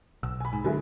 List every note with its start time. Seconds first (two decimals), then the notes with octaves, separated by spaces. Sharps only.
0.23 B1 E6
0.40 G#5 B5
0.53 G#2
0.65 D3 F#3 G#3 E4